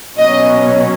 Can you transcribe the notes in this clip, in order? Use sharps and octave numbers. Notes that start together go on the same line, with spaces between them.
B2 F#3 C#4 D#5